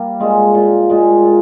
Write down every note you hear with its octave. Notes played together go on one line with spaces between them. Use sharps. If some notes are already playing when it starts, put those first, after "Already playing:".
Already playing: G3 A#3
A#2 G#3
A#2
A#2 G#3
A#2